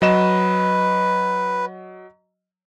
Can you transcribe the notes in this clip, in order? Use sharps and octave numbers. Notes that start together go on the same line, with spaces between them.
F#3 B4 D#5 E7